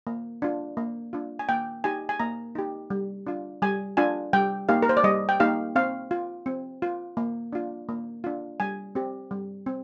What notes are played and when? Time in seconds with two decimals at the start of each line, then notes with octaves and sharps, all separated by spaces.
0.07 A#3
0.42 D4 F4
0.77 A#3
1.13 D4 F4
1.39 G#5
1.49 A#3 G5
1.84 D#4 G4 G#5
2.09 G#5
2.20 A#3 A#5
2.55 D#4 G4
2.90 G3
3.27 D4 F4
3.62 G3 G#5
3.97 D4 F4 G#5
4.33 G3 G5
4.69 A#3 D#4 G4 F5
4.82 A#4
4.89 C5
4.97 D5
5.04 G3 D#5
5.29 G5
5.40 A#3 D#4 G4 F5
5.76 C4 F5
6.11 F4
6.46 C4
6.82 F4
7.17 A#3
7.53 D4 F4
7.89 A#3
8.24 D4 F4
8.60 G3 G#5
8.95 C4 G4
9.31 G3
9.66 C4